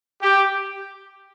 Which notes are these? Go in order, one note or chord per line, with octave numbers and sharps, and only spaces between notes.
G4